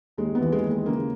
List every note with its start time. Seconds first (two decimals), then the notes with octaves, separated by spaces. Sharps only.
0.18 D#2 G#3
0.35 B3
0.41 E3
0.52 G#3
0.63 D#2
0.70 G#3
0.86 C#3 A#3